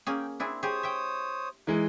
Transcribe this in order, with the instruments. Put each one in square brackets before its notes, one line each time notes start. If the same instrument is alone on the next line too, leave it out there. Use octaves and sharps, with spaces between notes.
[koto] A#3 C#4 G#4 [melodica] G5
[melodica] C4 [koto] D4 E4 G#4
[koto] G4 G#4 [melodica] C5 C#5 D#6
[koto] E5 G5
[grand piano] E3 G#3 [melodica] D#4